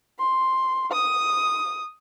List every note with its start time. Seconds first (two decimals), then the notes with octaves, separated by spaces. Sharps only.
0.19 C6
0.91 D#6